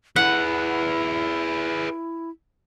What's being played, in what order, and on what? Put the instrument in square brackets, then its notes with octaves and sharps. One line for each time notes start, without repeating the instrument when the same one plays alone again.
[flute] E4 [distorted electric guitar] G#4 B4 [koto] F#5